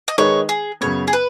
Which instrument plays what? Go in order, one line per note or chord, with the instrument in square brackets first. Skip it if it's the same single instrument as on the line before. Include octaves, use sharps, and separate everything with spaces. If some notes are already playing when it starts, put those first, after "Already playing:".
[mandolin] D#5
[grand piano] D#3 G#3 D#4 G#4 B4 [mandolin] C#5
[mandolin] G#4
[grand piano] F#2 C#3 B3 [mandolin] C#5
[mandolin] G#4
B4